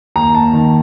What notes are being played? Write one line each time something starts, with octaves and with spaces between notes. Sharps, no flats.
D#2 A#5
A5
D#3